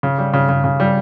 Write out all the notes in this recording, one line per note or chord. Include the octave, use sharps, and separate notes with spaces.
C#3
G3
C#3
C#3
C#3
G3